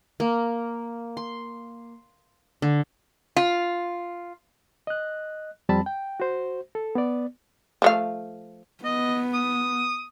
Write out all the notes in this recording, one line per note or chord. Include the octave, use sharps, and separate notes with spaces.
A#3
C6
D3
F4
D#5 F#6
F2 G3 C4 A5 B5
G5
F#4 C5
A4
B3 D5
F3 A3 F5
B3 D#5
D#6